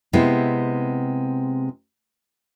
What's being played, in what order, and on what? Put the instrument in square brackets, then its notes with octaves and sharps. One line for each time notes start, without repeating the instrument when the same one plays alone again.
[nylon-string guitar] C3 G#3 B3 C4 E4